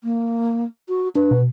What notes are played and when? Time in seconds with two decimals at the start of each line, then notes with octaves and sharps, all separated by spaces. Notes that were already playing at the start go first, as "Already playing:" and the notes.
0.04 A#3
0.89 F#4
1.15 D4 B4
1.31 B2